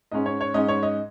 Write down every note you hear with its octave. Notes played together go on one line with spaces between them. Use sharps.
G#2 G#3 C#4 D#5
C#5
C#5
G#2 G#3 C#4 D#5
C#5
D#5